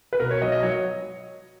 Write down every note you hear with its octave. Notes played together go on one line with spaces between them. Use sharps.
B4
B2 A#4
C#5
F#3 D#5
D#5
F#3 C#5